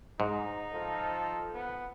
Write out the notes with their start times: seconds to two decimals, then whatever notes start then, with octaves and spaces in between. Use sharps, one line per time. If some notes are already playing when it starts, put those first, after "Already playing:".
0.20 G#2 D#4
0.72 F3 F4 A4
1.54 B3